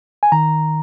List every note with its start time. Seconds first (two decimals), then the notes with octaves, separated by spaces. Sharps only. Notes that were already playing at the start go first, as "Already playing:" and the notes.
0.23 G#5
0.32 D#3 A#5